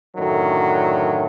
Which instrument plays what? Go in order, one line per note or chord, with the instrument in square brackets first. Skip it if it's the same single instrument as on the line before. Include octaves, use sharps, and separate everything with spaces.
[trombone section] F#2 A2 D3 D#3 F#3